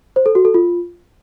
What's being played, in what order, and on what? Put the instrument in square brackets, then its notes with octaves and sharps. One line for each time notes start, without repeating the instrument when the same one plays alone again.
[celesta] C5
A4
F#4
A4
F4